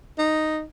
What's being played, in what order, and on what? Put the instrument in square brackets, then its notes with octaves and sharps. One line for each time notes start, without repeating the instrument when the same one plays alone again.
[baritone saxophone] D#4